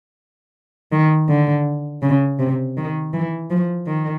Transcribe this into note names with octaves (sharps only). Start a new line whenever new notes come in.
D#3
D3
C#3
C3
D#3
E3
F3
D#3